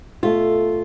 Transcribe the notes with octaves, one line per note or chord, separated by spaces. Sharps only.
B2 A3 F4